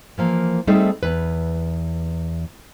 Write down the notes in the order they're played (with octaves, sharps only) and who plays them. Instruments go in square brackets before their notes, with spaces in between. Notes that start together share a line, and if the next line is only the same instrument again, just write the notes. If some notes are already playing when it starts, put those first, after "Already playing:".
[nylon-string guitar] E3 F3 A#3
G3 A3 C4 D#4 G#4 A4
E2 B4